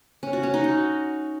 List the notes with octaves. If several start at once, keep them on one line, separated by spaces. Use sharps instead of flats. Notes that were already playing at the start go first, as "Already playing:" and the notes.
C#4
F#4
C#4
D#4
F#4